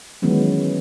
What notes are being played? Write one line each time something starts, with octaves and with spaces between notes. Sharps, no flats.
D#3 E3 F#3 G#3 B3 C#4